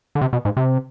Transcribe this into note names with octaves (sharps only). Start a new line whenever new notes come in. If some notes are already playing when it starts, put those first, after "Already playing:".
D3
C3
B2
G#2
C3